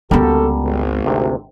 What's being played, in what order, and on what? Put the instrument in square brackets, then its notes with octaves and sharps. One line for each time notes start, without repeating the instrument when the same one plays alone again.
[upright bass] C#2 B3 [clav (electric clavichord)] D3 G3 A#4 [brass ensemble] A#3 F#4 A4
[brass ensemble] G#1
[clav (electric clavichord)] D2 C3